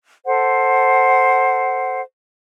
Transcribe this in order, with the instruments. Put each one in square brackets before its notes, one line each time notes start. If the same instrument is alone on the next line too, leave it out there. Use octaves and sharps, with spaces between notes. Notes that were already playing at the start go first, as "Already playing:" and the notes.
[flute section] A4 C5 F#5